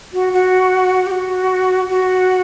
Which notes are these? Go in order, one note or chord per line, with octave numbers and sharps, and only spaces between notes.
F#4
F#4
G4
F#4
F#4